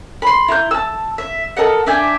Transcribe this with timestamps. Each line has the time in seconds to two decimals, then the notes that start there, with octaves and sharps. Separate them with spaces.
0.22 B5 C6
0.48 E4 A#5 C6 G6
0.71 A5 E6
1.18 E5
1.57 A4 A#4 D#5 F#5
1.86 D4 E5 G5 G#5